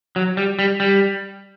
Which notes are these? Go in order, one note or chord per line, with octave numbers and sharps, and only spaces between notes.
F#3
G3
G3
G3